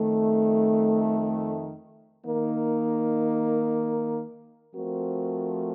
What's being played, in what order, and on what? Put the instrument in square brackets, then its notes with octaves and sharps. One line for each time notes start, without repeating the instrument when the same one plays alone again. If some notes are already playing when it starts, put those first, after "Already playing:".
Already playing: [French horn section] F2 D#3 A3
D#3 A#3 D#4 A#4
F3 A3 C4 F#4 A#4